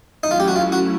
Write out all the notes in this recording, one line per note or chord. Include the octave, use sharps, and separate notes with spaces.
F#3 A3 C#4 D#4 E4
F4
G4
F#4
F4
F#4